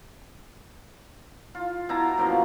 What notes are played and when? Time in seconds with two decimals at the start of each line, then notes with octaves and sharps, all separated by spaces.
1.55 F4
1.89 B2 E4 A5 A#5
2.18 F#2 B2 F3 A#3